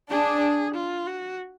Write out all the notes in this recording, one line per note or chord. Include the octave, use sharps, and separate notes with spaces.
D4 G#4
F4
F#4